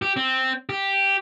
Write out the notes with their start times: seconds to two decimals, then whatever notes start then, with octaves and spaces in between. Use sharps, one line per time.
0.02 G4
0.16 C4
0.69 G4